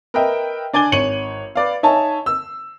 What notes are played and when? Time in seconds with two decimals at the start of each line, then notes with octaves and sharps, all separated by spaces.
0.14 A#4 B4 D#5 E5 G5
0.73 D4 D5 G#5 G#6 G7
0.92 G#1 C#5 C#7 D#7 F#7
1.55 B4 D5 F5
1.83 D#4 C#5 E5 G#5 A5
2.26 E6